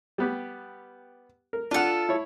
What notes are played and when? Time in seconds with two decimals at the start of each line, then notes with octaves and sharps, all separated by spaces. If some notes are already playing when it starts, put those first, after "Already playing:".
0.18 G3 B3 G4
1.53 A#4
1.71 D4 F4 A4 F#5
2.09 E4 C#5